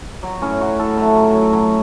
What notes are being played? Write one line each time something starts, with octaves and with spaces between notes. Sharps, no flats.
F#3
A2 C#4
F#3 F#4
A2 A4
F#3 A3
F#3
F#3
F#3